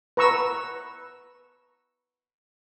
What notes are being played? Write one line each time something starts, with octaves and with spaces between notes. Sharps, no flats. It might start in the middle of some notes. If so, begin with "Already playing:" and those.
B4 A#5 C#6 E6